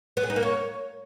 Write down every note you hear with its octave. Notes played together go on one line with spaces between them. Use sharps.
B3
G#4
D#4
A#3
C#5